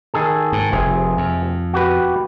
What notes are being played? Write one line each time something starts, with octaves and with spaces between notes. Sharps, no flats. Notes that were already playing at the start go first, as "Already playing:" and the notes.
D#3 G#4 A4
G#2
F1 C3 G#4
F2
F#4 G4 B4